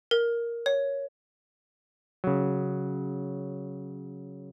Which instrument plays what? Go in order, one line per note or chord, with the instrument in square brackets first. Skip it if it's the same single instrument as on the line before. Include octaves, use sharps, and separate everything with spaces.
[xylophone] A#4
C#5
[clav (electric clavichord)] C#3 F#3